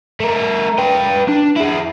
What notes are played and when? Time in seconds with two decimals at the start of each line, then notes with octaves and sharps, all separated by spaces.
0.20 A3 A#4
0.78 B4 G5
1.29 D4
1.57 E4 G#4